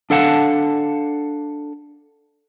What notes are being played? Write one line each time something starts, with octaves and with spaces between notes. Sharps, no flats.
D4 A4 F5 F#5 A5